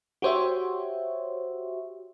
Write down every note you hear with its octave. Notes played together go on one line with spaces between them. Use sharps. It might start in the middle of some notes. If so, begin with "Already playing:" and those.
F#4 G4 C5 C#5 E5